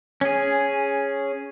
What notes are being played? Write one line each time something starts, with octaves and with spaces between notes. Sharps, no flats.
C#4 G#4